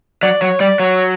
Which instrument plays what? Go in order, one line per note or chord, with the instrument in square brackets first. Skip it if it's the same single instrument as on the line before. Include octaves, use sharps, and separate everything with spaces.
[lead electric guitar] F#3 [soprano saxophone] D5
[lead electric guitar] F#3 [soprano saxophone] C#5
[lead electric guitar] G3 [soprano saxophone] D5
[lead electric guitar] F#3 [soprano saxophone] C#5